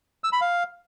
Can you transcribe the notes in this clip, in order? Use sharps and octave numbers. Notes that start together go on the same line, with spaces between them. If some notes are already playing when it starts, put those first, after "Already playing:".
E6
B5
F5